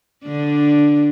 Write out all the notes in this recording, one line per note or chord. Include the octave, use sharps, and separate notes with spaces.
D3 D4